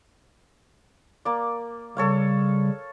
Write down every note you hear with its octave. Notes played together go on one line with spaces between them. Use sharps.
A#3 D5
C#3 G3 A4 C#5 F5